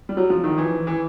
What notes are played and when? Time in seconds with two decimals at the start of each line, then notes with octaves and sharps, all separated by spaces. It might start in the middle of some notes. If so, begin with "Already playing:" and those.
0.09 G3
0.17 F#3
0.30 F3
0.44 D#3
0.58 E3
0.87 E3